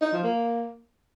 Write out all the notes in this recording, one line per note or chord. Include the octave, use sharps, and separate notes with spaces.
D#4
F3
A#3